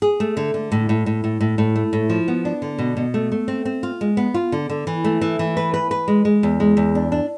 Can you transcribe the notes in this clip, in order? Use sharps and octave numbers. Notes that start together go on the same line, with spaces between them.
G#4
A3
D3
D3
A2
A2
A2
A2
A2
A2
A3
A2
F3
B3
D4
D3
B2
B2
A3
A3
C4
C4
F4
G#3
B3
F4
D3
D3
E3
A3
E3
E3
B4
B4
B4
G#3
G#3
E2
G#3
E2
D4
D4